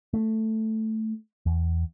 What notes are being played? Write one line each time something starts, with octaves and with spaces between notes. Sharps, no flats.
A3
E2